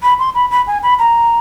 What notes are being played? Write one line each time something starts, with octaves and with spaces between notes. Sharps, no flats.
B5
C6
B5
B5
G#5
B5
A#5